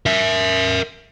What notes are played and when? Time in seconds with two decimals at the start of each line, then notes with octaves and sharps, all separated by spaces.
0.06 A#4 E5